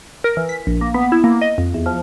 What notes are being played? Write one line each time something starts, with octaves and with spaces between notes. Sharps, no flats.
A#4
E3
B6
A#1
A#3
B3
E4
A#3
D#5
F2
E2
F3